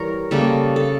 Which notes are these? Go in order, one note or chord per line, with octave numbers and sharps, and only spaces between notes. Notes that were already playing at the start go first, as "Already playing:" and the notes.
Already playing: E3 G3 A#4 C#5
C#3 G3 A#3 A4
A4